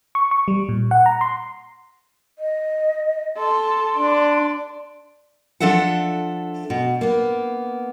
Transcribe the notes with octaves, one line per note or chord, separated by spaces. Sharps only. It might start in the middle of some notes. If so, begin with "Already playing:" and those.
C#6
C#6
G3
A#2
F#5
A#5
C6
D#5
A4 C6
D4 D5
F3 D4 A4 E5 F#5
B2
A#3 B3